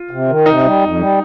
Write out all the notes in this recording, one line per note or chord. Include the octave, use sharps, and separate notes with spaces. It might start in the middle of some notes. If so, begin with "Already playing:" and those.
Already playing: F4
C3
D#3
C3 D#4
G3
F2
G3